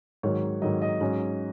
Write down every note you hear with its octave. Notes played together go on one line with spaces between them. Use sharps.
G#2 D#3 F#3 C#5
G#2 D#3 F#3 D#5
D#5
G#2 F#3 C#4